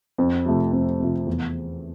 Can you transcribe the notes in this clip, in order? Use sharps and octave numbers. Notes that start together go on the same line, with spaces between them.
F2
C3 F3 A3
F2
C3 F3 A3
E2